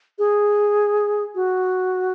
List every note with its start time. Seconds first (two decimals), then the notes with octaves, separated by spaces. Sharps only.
0.19 G#4
1.35 F#4